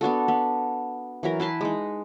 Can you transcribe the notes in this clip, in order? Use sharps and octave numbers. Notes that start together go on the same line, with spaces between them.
B3 D4 F#4 A4
B3
E3 F#3 A#4
E4 B4 A5 C6
G#3 D#4